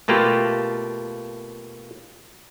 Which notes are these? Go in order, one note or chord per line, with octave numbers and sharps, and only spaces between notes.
B2 A3 A#3 F4 G4